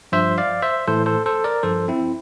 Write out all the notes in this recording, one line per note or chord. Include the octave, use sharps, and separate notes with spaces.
G2 F3 C5 E5
D5 F5
C5 E5
A2 E3 A4 C5
A4 C5
A4 C5
A#4 D5
G2 F3 A4 C5
C4 E4